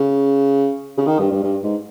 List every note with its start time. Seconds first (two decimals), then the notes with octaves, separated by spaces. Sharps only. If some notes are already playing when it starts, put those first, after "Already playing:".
Already playing: C#3
0.98 C#3
1.07 D#3
1.19 G2
1.31 G2
1.43 G2
1.63 G#2